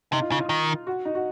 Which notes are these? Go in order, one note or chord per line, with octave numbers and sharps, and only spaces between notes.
C3 D#4
F4
C#3 D#4
F4
D#3
F#4
D#4
F#4